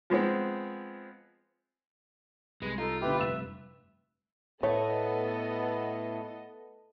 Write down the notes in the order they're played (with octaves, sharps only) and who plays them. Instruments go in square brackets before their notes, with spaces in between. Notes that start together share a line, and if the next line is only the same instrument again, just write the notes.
[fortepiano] F3 G#3 B3 C4
[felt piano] C2 [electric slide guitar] G#3 [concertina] B4
[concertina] D#4 [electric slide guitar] F4 [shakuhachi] A4
[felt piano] A#2 D3 [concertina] E4 G4 [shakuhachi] B4
[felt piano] F1 G2 E7 [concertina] E5
[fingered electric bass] A2 [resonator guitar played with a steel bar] A3 [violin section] B3 A4 D#5 [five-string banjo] C#5